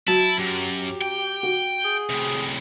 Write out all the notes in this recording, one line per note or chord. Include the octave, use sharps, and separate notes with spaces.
F#3 E4 A5
F#2 G4
G5
F#4
G#4
A2 C3